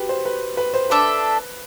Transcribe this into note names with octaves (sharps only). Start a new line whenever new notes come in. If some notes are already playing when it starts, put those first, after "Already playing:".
Already playing: F#4 G4 B4
C5
B4
B4
C5
D4 A4 B4 E5